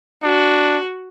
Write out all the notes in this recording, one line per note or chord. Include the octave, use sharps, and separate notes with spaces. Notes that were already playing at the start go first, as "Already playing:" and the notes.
D4 F#4